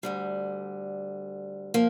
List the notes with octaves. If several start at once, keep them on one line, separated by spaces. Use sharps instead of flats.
D2 D3 G3
F3 A#3